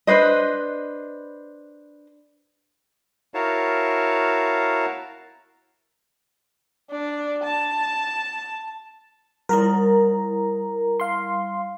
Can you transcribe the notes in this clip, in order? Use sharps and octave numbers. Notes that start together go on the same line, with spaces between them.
D4 B4 C5 D#5
E4 F#4 A#4 C#5 F5 A5
D4
A5
G3 E4 A#4 A#5
F5 C6